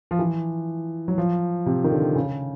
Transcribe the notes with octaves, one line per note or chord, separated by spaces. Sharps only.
F3
E3
F#3
F3
C3
D#3
D3
C#3